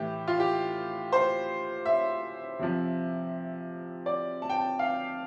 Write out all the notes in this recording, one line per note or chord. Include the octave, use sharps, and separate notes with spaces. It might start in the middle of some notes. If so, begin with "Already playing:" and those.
Already playing: A2 E3 G4
F4
G4
C5
E5
C3 F3
D5
A5
G5
A5
F5